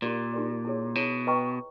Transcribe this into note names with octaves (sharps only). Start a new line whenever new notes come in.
A#2 D#4 G4 A#4 D5
D#4 G4 A#4 D5
E4 G#4 C#5
B2 E4 G#4 C#5
B4 D#5 G5 A#5 C#6